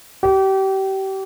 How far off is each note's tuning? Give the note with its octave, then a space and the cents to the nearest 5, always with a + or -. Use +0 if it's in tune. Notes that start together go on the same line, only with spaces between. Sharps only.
G4 -30